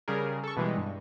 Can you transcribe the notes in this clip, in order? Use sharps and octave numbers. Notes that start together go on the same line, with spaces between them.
C#3 G3 G#4 A#4
A4 C#6
B2 E3 G3 G#3
G2